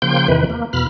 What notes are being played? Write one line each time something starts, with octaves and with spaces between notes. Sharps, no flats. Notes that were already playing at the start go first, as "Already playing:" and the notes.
C#3 F3 A#3 G5 C6 G6
E2 C3 D#3 E3 B4
A#3
E2 B2 B5 F6